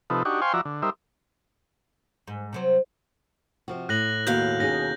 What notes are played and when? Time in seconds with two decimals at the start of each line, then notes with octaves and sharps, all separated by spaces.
0.10 C3 F3 D#4 A4 B4
0.25 D4 D#4 F#4 G4 C#6
0.41 C5 F5 G5 G#5 C6 C#6
0.54 F3 F#4 D5 E5 A#5
0.65 D3
0.82 G3 D#4 A#4 C5 E5
2.27 G#2
2.53 C3 F#3 C5
3.68 C3 F3 F#4
3.89 A2 F#6 A#6 F#7
4.27 D#2 B2 F5 G6
4.60 C#4 D#4 G#4 A#6